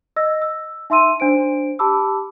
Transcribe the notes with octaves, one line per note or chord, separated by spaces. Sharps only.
D#5 E6 A#6
E6
D#4 E5 C6 E6 D#7
D4 C5 D7
G4 A5 B5 D6 E6